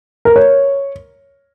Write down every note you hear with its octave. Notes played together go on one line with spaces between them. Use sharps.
A#4
C#5